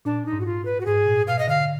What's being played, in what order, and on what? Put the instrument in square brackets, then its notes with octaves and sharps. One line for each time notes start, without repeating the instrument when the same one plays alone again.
[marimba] A#2 [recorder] D4
[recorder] D#4
[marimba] G#2
[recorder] F#4
F4
B4
F#4
[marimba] G#2 [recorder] G#4
[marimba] A#2
[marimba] B2 [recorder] F5
[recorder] D#5
[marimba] D3 [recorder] F5